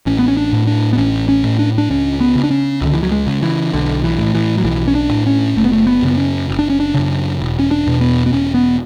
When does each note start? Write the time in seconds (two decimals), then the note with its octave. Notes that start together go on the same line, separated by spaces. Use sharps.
0.06 A1 C#4
0.19 B3
0.28 C#4
0.37 D4
0.53 A2
0.67 D4
0.93 B3
0.98 A1 C#4
1.29 C#4
1.44 A2
1.59 D4
1.78 D4
1.90 C#2 C#4
2.20 B3
2.35 C#3
2.43 D4
2.51 C#4
2.82 C#2 D3
2.93 E3
3.03 F#3
3.12 G#3
3.27 C#3
3.42 E3
3.73 B1 D3
4.04 E3
4.18 A2
4.34 E3
4.58 F#3
4.64 B1 E3
4.88 C#4
4.95 D4
5.11 A2
5.26 C#4
5.56 F#1 A3
5.64 B3
5.72 A3
5.87 B3
6.02 F#2 C#3 B3
6.18 C#4
6.49 F#1
6.59 D4
6.70 C#4
6.80 D4
6.94 F#2 C#3
7.40 E1
7.59 C#4
7.71 D4
7.86 E2 B2
8.01 B3
8.26 B3
8.32 E1 C#4
8.54 B3